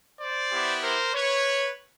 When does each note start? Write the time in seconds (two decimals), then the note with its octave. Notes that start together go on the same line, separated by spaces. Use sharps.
0.20 C5 D5
0.51 B3 E4 G4
0.82 A#4 C5
1.14 B4 C#5